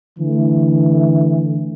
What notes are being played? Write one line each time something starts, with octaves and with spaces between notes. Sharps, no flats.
D3 E3 A3